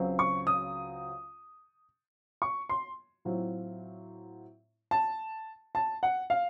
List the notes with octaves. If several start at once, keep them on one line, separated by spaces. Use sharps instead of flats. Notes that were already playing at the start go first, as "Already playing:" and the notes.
Already playing: C#2 C#3 F#3 C4
C#6
D#6
C#6
C6
A2 F#3 C4 F4
A5
A5
F#5
F5